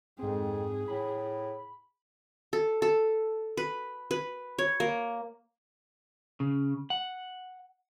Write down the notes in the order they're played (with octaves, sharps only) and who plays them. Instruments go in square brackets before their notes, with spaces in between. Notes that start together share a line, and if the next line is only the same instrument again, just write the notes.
[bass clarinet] F2 [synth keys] G#2 C4 [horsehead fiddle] G#4
[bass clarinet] A2 [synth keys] B5
[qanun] A4
A4
B4
B4
C#5
A#3
[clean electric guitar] C#3
F#5